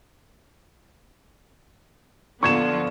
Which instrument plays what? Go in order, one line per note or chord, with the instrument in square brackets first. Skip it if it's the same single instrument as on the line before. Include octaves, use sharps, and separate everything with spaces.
[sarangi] D3 [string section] F3 B3 F4 [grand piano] C#6 G#6 E7